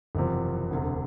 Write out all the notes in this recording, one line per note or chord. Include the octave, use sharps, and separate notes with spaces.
F#1 E2 C3 F3
E1 D2 C3